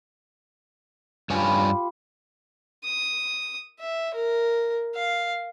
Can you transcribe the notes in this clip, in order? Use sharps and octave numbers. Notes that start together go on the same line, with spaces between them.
G2 F4 G4 C#5 G#5 B5
D#6
E5
A#4
F5